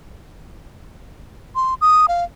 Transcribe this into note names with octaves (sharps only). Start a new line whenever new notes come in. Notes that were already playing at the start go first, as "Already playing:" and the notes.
C6
D#6
F5